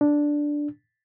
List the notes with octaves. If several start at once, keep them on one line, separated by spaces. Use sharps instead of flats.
D4